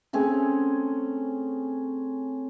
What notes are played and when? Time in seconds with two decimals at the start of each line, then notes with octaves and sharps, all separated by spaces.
0.13 A3 C4 C#4 G#4